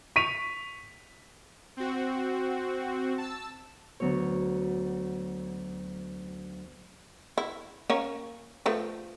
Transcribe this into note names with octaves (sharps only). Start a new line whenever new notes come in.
C#6 B6 D#7 F7
C4 F#4
A5 E6
D2 F#3 B3 C#5
E4
A#3 C#4 C#5
F3 A3 B4